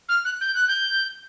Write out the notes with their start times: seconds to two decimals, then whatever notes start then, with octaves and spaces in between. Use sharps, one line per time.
0.09 F6
0.25 F#6
0.41 G6
0.55 F#6
0.68 G6